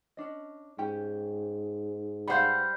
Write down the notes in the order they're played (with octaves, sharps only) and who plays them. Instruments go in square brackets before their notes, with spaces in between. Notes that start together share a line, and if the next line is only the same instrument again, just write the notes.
[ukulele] C#4 D4 D#5
[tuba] G#2 [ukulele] C#4 G4 G5
[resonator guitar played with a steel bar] G3 C5 F5 [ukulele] B4 F#5 A5 [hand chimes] B5 G6